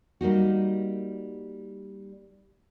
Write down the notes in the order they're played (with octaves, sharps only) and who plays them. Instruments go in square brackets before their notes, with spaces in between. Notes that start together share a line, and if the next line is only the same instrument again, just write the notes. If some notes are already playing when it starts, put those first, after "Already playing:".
[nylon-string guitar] G3 A#3 D#4 F#4